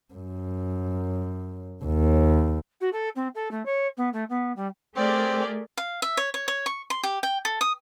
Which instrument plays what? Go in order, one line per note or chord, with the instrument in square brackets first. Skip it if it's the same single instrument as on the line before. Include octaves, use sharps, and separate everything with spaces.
[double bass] F#2
D#2
[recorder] F#4
A4
C4
A4
A3
C#5
B3
A3
B3
G3
[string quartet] A3 G4 [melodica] C4 [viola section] G#4 A#4 D5
[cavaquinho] F5
E5
C#5
C#5
C#5
C#6
C6
G4
G5
A4
D#6